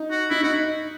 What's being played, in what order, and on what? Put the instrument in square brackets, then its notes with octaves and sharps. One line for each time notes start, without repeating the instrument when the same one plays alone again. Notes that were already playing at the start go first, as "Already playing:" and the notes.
Already playing: [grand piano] D#4
[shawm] F#4
[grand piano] D#4 [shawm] E4
[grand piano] D#4 [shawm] F#4